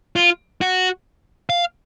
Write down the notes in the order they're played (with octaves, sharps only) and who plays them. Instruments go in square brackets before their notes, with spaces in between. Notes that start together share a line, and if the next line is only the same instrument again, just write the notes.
[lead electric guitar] F4
F#4
F5